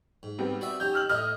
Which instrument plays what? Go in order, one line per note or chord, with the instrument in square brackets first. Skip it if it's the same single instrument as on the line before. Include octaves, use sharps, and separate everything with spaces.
[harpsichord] G#2
[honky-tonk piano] G3 B3 C4
[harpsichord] F#4 D5 E5
[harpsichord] C#4 D#4 G4 [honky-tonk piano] G6
[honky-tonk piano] E6 F6 F#7
[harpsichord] A2 E4 [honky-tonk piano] D#5 D#6 F6